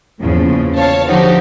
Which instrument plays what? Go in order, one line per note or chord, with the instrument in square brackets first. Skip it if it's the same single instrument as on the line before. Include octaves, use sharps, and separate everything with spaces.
[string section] E2 A#2 C#3 F3
C#5 F5 A5
D3 F3 D#4 F#4 G4 C5